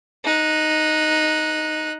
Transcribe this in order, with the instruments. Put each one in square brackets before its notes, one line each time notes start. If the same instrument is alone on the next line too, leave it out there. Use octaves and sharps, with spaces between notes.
[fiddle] D#4 F#6